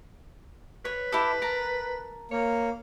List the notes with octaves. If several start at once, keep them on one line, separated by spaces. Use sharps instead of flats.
B4 C#5
E4 G4 A4
A#4 A5 A#5
A#3 C#5